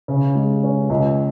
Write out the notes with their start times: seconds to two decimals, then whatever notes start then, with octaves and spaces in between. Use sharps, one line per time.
0.08 C#3
0.35 G#3
0.64 C#4
0.90 C#2